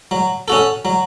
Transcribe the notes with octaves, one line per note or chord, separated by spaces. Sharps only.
F#3
C#4 F#4 A4
F#3